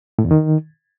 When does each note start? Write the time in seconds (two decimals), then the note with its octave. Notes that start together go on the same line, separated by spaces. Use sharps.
0.19 A2
0.25 E2
0.31 D#3